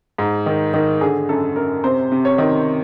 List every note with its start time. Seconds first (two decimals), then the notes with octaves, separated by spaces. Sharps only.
0.18 G#2
0.46 D#3
0.74 D#3
1.01 D3 G#4
1.29 F#2 A4
1.56 F#2 A#4
1.84 C3 C5
2.12 C3
2.25 C#5
2.38 D#3